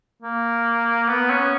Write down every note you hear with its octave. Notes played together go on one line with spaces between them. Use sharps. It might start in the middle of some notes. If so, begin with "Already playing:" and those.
A#3
B3
C#4